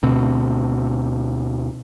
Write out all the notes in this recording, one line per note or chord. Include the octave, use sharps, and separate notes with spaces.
D2 B2 C4